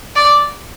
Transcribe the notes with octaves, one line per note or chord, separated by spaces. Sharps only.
D5